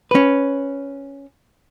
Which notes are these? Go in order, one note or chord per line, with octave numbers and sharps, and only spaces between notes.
C#4 B4